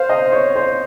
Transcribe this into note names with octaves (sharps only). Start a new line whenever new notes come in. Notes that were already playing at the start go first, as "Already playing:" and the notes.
Already playing: C5 F5
D#5
C#5
C5